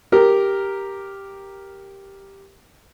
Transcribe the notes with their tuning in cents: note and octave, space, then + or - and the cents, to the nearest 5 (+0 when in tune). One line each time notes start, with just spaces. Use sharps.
G4 +0 A#4 +0